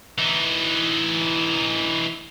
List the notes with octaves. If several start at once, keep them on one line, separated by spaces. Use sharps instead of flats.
E3 D#4